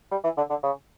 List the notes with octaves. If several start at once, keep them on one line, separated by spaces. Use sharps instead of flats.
G3
E3
D3
D3
C#3